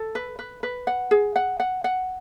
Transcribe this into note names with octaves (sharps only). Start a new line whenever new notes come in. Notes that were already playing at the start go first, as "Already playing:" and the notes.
Already playing: A4
B4
B4
B4
F#5
G#4
F#5
F#5
F#5